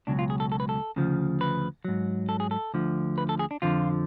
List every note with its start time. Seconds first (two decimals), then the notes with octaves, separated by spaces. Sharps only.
0.07 C#2 B2 F#3 D4
0.19 F4
0.30 G#4
0.40 A4
0.52 A4
0.60 B4
0.69 A4
0.96 D2 C#3 F3
1.41 B4
1.85 G#2 F#3
2.29 A4
2.40 G#4
2.51 A4
2.74 D2 D3 F3
3.18 B4
3.29 A4
3.39 G#4
3.51 D4
3.62 F2 D3 F3 F4